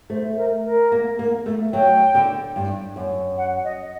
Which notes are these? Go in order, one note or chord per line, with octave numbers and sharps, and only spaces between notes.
A3 C5
A#4
A#4
A#3
A#3
A3
F#3 G5
D3
G2
F#2
F#5
D#5